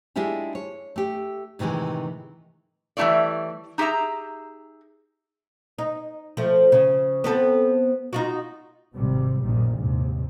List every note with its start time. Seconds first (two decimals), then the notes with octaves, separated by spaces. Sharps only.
0.16 G#3 D4 E4 F4 G4
0.55 C#5
0.96 A3 G4
1.59 A2 C3 D#3 E3 G#3
2.97 E3 G3 A3 E4 C#5 D5
3.78 D#4 G4 G#4 E5 A#5
5.79 D#4
6.37 F3 A3
6.72 C#3
7.24 B3 C4 A4
8.13 D#4 F4 F#4
8.95 G#1 C3 G3
9.44 A#1 F#2 A#2 D#3 G3
9.76 D#2 G#2 C3